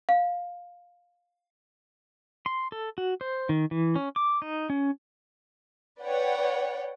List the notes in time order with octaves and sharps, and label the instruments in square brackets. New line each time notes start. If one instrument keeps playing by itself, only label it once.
[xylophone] F5
[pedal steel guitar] C6
A4
F#4
C5
D#3
E3
C#4
D6
D#4
C#4
[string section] B4 C#5 D5 F#5 G5